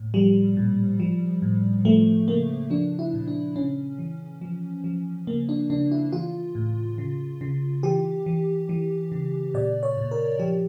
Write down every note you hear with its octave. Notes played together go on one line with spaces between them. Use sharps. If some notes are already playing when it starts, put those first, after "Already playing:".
Already playing: A2
F3 G3
A#2
F3
A2
F3 A3
C#3 A#3
F3 D4
E4
A#2
D4
C#3 C#4
E3
F3
F3
C#3 A#3
D4
C#3 D4
E4
E3 F4
A2
C#3
C#3
E3 G4
E3
E3
C#3
A#2 D5
C#5
A#2
A#4
F3 G4